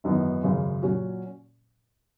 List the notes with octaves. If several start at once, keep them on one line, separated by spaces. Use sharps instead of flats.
G#1 F#2 E3 B3 D#4
G#1 F#2 C#3
A#2 F#3 C#4 F#4